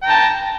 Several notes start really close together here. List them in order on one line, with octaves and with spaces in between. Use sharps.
G5 A#5 A5